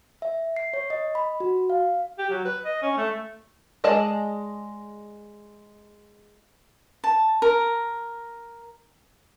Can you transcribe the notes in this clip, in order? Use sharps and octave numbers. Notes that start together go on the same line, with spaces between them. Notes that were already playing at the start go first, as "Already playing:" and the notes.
E5
C7
C#5
D#5
B5
F#4
F5
G4
F#3
B4
D#5
C#4
A3
G#3 G#4 D5 D#5 A5
A5
A#4